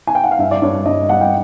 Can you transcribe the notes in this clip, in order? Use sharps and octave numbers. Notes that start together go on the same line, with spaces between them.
G#5
G5
F#5
F5
G2 E5
D5
G2 C#5
G2 D#5
G3 F#5
G5